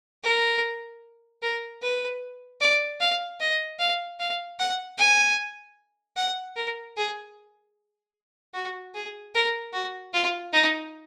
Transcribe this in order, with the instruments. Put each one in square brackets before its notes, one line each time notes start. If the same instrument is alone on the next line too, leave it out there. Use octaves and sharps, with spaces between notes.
[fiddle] A#4
A#4
B4
D5
F5
D#5
F5
F5
F#5
G#5
F#5
A#4
G#4
F#4
G#4
A#4
F#4
F4
D#4